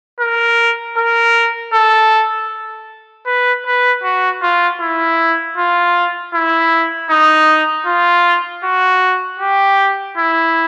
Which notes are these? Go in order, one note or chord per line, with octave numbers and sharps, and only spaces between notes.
A#4
A#4
A4
B4
B4
F#4
F4
E4
F4
E4
D#4
F4
F#4
G4
E4